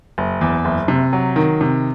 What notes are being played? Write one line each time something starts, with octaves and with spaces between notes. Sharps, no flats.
F#1
E2
F#1
C3
F#3
D#3
C3